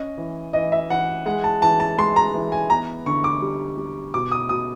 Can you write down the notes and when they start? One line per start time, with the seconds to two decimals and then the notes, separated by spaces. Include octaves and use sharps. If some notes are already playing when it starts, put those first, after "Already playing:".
Already playing: C#4 D#5
0.18 E3
0.53 E3 D#5
0.72 E5
0.90 E3 F#5
1.26 G#3 F#5
1.44 A5
1.62 E3 A5
1.80 A5
1.98 G#3 C6
2.16 A#5
2.34 E3
2.52 G#5
2.70 B3 A#5
3.06 D3 C#6
3.24 D6
3.42 G3
3.77 G3
4.14 B2 D6
4.32 D#6
4.49 B2 D#6